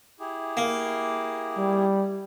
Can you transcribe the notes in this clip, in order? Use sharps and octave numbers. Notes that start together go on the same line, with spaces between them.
E4 G4 G#4
A#3
G3